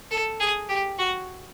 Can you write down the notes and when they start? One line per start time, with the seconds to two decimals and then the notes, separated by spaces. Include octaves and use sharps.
0.11 A4
0.40 G#4
0.69 G4
0.99 F#4